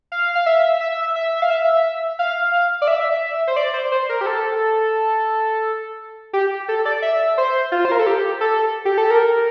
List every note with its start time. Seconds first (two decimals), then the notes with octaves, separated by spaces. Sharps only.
0.12 F5
0.35 F5
0.46 E5
0.80 E5
1.16 E5
1.42 F5
1.50 E5
2.19 F5
2.82 D5
2.88 E5
3.47 C5
3.56 D5
3.74 C5
3.92 C5
4.09 A#4
4.21 G4
4.26 A4
6.33 G4
6.68 A4
6.85 D5
7.02 E5
7.38 C5
7.72 F4
7.85 C5
7.92 A#4
7.99 A4
8.06 G4
8.41 A4
8.85 G4
8.98 A4
9.11 A#4